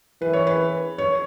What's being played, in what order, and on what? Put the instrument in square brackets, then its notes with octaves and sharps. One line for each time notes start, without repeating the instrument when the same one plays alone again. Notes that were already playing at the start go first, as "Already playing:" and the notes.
[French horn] E3 [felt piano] B4
[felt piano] C#5
B4
C#5